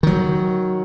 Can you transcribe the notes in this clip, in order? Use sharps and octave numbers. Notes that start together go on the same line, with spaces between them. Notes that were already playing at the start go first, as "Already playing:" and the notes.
D#3 F#3